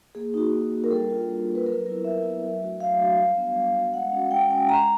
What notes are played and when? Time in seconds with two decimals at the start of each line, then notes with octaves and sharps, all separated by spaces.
0.15 A#3 G#4
0.34 D#4 F#4
0.53 A#3
0.72 D#4 F#4
0.84 A#4
0.91 G3 A4
1.10 A#3 D4 F4
1.29 G3
1.47 A#3 D4 F4
1.55 B4
1.66 F#3 A#4
1.86 B3 E4 A#4
2.04 F#3 E5
2.23 B3 E4
2.42 F#3
2.61 A3 D4 F#4
2.80 F#3 F5
2.99 A3 D4 F#4
3.18 G3
3.37 B3 D4 F#4
3.56 G3
3.74 B3 D4 F#4
3.93 G#3 F#5
4.12 C#4 F#4
4.31 G#3 G5
4.50 C#4 F#4 G#5
4.69 G#3 A#5